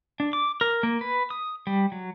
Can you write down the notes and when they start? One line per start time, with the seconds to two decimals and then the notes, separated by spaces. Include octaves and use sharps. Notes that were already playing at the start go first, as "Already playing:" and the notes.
0.20 D4
0.33 D6
0.61 A#4
0.83 A#3
1.01 B4
1.30 D#6
1.67 G3
1.92 F#3